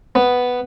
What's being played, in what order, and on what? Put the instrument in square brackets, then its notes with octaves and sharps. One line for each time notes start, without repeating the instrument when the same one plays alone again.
[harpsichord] B3